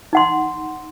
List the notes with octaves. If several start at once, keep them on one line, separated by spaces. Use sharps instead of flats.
D#4 F#5 C6